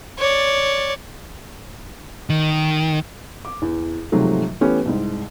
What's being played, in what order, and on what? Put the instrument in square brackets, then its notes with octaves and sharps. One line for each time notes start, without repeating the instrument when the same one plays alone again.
[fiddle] C#5 D5
[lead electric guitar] D#3
[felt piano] D6
E2
G#2 C3 D#3 F3 F#3 A3
E3 A3 B3 C#4 G4 B4
C2 G#2